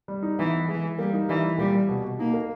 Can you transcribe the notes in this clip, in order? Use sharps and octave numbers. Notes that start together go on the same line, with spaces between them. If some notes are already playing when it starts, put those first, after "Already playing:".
G3
D#4
E3 B3
B3
E3 G#3
E3
G3 A#3
D#4
E3 G3
E3
A#2 G3
G3
B2
B2
A#3 D#4
A#3